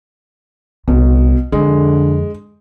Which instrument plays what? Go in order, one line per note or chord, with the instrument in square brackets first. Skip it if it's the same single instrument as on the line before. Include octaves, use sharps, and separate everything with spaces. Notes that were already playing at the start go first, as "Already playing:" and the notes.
[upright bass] C2 [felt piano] B2
[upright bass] F2 [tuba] D3 [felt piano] G#3